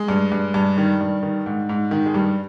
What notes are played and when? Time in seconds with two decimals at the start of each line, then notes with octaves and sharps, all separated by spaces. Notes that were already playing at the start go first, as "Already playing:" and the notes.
Already playing: G#3
0.08 G2
0.32 G2
0.54 G2
0.77 D#3 G3
1.01 G2
1.23 D#3
1.46 G#2
1.69 G#2
1.91 D#3
2.06 G#3
2.14 G2 G3